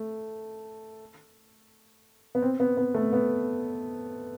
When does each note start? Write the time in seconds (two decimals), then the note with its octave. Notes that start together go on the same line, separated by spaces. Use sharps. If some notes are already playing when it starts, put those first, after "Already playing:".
Already playing: A3
2.35 B3
2.42 C4
2.60 B3
2.77 B3
2.94 A3
3.13 B3